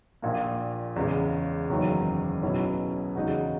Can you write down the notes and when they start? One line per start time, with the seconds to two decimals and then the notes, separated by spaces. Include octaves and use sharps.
0.22 A#1 A#2 A#3
0.96 E2 C#3 G#3
1.70 F#1 E2 D#3 F#3 A#3
2.42 B1 B2 F#3 C#4 E4
3.16 E2 C#3 G#3 D#4 F#4